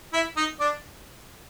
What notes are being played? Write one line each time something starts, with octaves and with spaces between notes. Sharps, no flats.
E4 E5
D#4 D#5
D4 D5